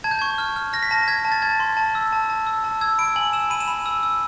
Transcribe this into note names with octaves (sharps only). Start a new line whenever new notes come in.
A5 G#6
G6
C#6 G#6
F6
F6
F6 A#6
B6
A5 A#6
F6 G#6
A5
A6
A5 G#6
C6
A5
E6
A5
A5
E6
A5
E6 G#6
B5 D7
G#5 F#7
E6 E7
B5 D#7
E7
B5 D#7
E6
E6